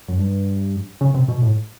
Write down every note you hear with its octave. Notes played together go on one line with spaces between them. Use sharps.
F#2
G2
C#3
C3
B2
A2